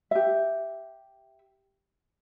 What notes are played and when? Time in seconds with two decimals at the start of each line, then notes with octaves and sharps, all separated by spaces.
0.11 G4 E5